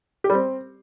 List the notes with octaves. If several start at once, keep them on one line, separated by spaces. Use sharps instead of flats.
G4
G3
C4